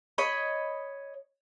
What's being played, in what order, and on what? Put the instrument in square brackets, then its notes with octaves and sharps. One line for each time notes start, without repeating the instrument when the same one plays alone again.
[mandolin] C#5 D#5 B5